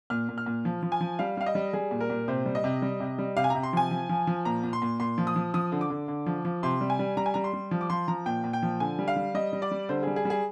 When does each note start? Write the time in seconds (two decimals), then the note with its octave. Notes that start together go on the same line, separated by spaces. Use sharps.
0.10 A#2 F6
0.29 A#2
0.38 F6
0.46 A#2
0.65 F3
0.83 F3
0.92 G#5
1.01 F3
1.19 G3 F5
1.37 G3 F5
1.46 D#5
1.55 G3
1.73 G3 G#4
1.91 A#2
2.01 A#4
2.10 A#2
2.28 C3 C5
2.46 G3
2.55 D#5
2.64 C3
2.82 G3
3.00 C3
3.18 G3
3.36 C3 F5
3.44 G#5
3.50 C3 A#5
3.63 C6
3.73 F3 G#5
3.91 F3
4.09 F3
4.27 F3
4.45 A#2 A#5
4.63 A#2
4.73 C6
4.82 A#2
5.00 A#2 C6
5.18 F3
5.27 D#6
5.36 F3
5.54 F3 D#6
5.72 D3
5.81 D6
5.90 D3
6.08 D3
6.26 F3
6.45 F3
6.63 C3 C6
6.81 G3
6.90 G#5
6.99 G3
7.17 G3 A#5
7.26 G#5
7.34 G3 A#5
7.44 C6
7.53 G3
7.71 F3
7.81 D6
7.90 F3 C6
8.08 F3 A#5
8.26 A#2 G5
8.44 A#2
8.53 G5
8.62 F3
8.80 D3 G#5
8.99 G3
9.08 F5
9.16 G3
9.34 G3 D#5
9.53 G3
9.62 D5
9.71 G3
9.89 D3 C5
10.03 G3 G#4
10.16 G#4
10.25 G3
10.30 G#4